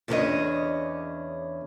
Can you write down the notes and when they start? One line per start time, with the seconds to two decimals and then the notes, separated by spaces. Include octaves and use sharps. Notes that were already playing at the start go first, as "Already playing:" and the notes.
0.08 E2 C#3 D4 A#4 C#5 D#5